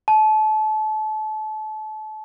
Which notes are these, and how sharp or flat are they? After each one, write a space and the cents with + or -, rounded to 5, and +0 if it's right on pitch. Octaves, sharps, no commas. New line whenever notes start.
A5 -30